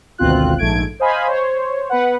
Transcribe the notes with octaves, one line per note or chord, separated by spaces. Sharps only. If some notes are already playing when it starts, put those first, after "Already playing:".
G#1 D2 B2 C4 F4 F#6
A#1 G#2 A3 G#6 D7
C5 D#5 F5 G#5 B5
C5 C#5
B3 B4 F#5